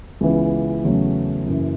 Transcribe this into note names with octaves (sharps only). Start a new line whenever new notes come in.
C#2 C#3 E3 B3
E2 C#3 F#3 A3 C#4
F#1 F#2 E3